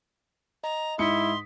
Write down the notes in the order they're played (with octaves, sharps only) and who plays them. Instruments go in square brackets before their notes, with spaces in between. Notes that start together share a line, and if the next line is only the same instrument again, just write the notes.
[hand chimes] D#5 [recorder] A#5
[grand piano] G#2 D#4 C#7 [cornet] E4 [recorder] C6 [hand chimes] D#6 B6